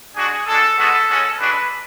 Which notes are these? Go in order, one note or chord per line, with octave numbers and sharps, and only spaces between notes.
G#3 D4 F#4 G#4
G#3 D4 F#4 A4
G#3 B3 F#4 A4
G#3 C#4 F#4
G#3 D4 F#4 B4